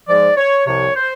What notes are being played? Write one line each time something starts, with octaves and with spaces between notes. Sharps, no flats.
G#2 F3 G#3 D5
C#5
C2 C3 F3 C#5
C5